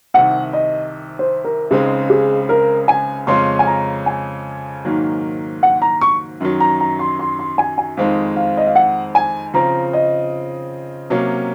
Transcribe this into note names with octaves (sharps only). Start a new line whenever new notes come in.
C2 C3 D#3 F#5
D#5
C5
A#4
C#2 C#3 G#3 C4 D#4 G#4
G#4
A#4
G#5
F2 C#3 G#3 C#4 F4 C6
G#5
A#5
G#5
G#2 D#3 F#3 A#3
F#5
A#5
C#6
F#2 D#3 F#3
A#5
A#5
C6
C6
C6
G#5
G#5
F2 D#3 G#3 C4 D#4 F5
F5
D#5
F5
F#5
G#5
C#3 F3 C4 A#5
D#5
C3 F#3 A#3 C#4